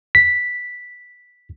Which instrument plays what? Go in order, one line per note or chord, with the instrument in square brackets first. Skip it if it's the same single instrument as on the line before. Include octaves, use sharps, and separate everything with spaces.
[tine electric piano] B6